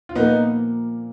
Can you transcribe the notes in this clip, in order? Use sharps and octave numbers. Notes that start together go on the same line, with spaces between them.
F4
A#2 F3 A#3 B3 D#4